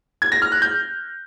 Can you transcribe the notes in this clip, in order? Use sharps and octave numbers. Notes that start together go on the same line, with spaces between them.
G#6
A#6
F6
F#6
G6